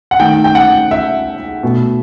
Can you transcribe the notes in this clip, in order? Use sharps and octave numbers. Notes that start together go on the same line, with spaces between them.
F#5
D#3 A3 G5
G5
F#5
E5
B2 A3